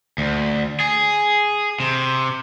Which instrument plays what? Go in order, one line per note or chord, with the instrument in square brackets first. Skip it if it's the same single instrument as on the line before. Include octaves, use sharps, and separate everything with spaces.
[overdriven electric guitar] D2
G#4
C3